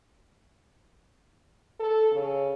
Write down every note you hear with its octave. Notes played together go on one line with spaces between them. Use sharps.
A4
C#3